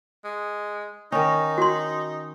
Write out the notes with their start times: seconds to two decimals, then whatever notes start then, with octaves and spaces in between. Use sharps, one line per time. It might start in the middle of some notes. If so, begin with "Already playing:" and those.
0.24 G#3
1.12 D#3 C#4 D#4
1.58 F#4 C6